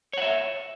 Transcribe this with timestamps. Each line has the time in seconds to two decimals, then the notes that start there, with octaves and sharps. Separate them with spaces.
0.13 C#5
0.18 F#5
0.22 E5